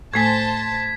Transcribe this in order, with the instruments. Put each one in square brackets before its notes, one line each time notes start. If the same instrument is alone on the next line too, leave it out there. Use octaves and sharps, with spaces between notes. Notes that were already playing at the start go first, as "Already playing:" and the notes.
[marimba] A2 A3 G#5 [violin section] C5 A5 [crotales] G#6 B6